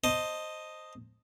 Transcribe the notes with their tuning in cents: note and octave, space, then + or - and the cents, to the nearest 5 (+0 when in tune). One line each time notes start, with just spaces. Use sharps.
C5 +5 D#5 +0 A5 +15